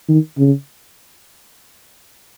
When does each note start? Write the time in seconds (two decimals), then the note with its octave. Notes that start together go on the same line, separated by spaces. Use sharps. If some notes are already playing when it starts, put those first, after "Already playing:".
0.09 D#3
0.38 C#3